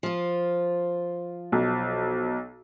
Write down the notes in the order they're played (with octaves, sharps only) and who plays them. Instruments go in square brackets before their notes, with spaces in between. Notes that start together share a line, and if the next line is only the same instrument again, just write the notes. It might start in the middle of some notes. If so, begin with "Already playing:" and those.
[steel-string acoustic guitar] F3 F4
[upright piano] B1